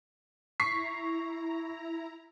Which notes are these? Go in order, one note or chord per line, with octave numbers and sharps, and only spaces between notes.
E4 A#5 C#6 B6 C7